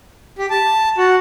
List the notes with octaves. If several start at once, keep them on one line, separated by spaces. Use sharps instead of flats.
G4
A5
F#4